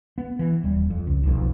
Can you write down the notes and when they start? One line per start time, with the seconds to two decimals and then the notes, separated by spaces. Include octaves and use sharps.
0.18 B3
0.39 E3
0.64 D#1 G3
0.90 F2
1.07 C#2
1.23 F1 B1 F2